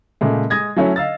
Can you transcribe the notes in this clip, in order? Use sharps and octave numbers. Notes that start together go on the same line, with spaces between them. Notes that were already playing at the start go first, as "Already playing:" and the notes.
A#2 C#3 G#3 A3
G#3 D#6 G#6 A#6
F#3 A3 C#4 E4 C#5
D#5 F5 E6 A6